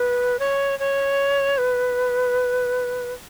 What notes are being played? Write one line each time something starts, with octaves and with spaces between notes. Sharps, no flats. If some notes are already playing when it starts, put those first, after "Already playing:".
Already playing: B4
C#5
C#5
B4